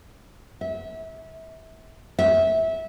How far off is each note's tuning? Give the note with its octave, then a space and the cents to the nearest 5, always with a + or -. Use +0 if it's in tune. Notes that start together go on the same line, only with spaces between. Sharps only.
E5 -30
E5 -20